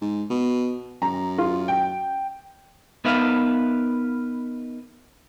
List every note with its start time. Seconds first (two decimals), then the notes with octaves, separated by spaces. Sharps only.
0.02 G#2
0.30 B2
1.02 F#2 A#5
1.38 F4
1.68 G5
3.05 B3 D#4 A#4 B4 E5 F5